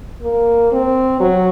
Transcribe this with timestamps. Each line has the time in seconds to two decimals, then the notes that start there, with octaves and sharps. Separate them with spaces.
0.22 A#3
0.72 C4
1.20 F#3